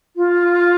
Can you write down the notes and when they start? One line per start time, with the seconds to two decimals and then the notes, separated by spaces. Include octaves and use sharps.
0.16 F4